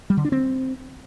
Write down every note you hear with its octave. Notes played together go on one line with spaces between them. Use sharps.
G3
D3
D4
C4